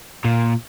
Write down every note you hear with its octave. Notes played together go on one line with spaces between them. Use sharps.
A#2